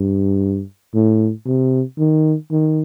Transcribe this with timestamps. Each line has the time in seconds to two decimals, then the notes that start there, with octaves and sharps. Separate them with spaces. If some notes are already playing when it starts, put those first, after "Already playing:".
Already playing: G2
0.94 A2
1.46 C3
1.98 D#3
2.51 D#3